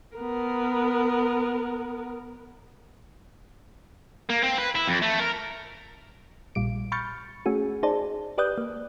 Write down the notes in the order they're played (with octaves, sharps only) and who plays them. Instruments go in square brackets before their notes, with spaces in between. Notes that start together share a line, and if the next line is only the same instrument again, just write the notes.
[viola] B3 A#4
[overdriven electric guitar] A#3
C4
B4
E4
F2
A3
A#4
[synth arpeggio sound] A#1 A#2 G3 D7
B5 C#6 F6 G6 A6 C#7
A3 C#4 F#4 G#4
D#4 G#4 C5 D5 A5
G4 B4 D5 D#6 F#6 G6
A#3